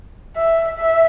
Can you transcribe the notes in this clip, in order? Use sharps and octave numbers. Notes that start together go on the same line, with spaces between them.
E5
E5